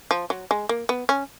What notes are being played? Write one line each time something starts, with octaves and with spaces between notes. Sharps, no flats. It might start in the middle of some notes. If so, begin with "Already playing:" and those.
F3
F#3
G#3
A#3
B3
C#4